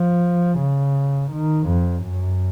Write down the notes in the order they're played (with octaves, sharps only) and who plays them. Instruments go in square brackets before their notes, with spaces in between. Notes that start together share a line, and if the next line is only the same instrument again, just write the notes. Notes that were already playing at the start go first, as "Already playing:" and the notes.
Already playing: [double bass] F3
C#3
D#3
F2
F#2